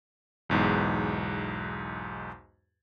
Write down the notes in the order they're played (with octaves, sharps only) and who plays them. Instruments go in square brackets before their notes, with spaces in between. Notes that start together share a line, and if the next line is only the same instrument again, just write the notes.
[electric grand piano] B1 E2 G#2